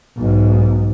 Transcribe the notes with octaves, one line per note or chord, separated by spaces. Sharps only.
B1 G#2